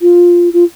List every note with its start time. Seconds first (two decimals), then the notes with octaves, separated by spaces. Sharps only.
0.02 F4
0.53 F4